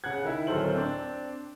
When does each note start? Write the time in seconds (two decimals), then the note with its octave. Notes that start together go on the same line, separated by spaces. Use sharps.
0.04 C#3 F#5 F#6 G#6
0.25 D#3 E4
0.47 D1 F#3 A4 A#4 C5 F#7
0.76 C4 D4